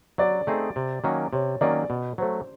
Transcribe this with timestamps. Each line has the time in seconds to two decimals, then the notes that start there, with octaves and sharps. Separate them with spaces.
0.18 F#3 D5
0.47 A3 C4 D#4 G#4
0.76 C3
1.04 D#3 F#3 A#3 C#4
1.33 C3 C#5
1.61 D#3 F#3 A#3 C#4 D5
1.90 B2
2.18 F#3 A3 C5